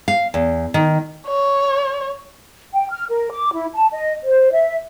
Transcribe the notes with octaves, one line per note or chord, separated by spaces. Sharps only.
F5
E2
D#3
C#5
G5
F6
A#4
D6
E4
A5
D#5
C5
E5